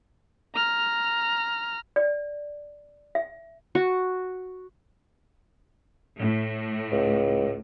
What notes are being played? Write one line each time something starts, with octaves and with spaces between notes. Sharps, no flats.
A#5 F6
D5
E5
F#4
A2
C#2